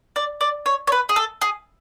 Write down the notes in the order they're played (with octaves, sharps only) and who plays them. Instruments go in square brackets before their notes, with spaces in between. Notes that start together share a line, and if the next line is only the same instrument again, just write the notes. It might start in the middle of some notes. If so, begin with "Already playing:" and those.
[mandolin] D5
D5
C#5
C#5
B4
G#4
A4
G#4